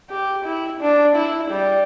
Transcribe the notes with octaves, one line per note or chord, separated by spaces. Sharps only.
G4
E4
D4
E4
G3